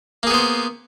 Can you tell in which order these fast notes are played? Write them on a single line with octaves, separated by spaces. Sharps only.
A#3 G#4 B3 C5